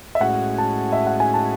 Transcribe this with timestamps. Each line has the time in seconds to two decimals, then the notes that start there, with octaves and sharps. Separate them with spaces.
0.15 E5
0.20 A2 G#3 C#4 F#4 F#5
0.58 A5
0.93 E5
1.07 F#5
1.20 G#5
1.34 A5